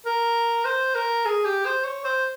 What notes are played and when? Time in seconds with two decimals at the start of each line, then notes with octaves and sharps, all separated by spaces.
0.06 A#4
0.65 C5
0.95 A#4
1.26 G#4
1.45 G4
1.65 C5
1.85 C#5
2.04 C5